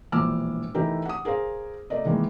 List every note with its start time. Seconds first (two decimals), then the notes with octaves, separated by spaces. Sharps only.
0.12 E1 A#1 E3 D6 E6 F6
0.74 E3 A3 D#4 G4 A#4
1.05 F#5 D#6
1.25 G#4 A#4 C5 F5
1.90 A3 A#4 D5 D#5
2.05 D#3 E3 G#3 A#3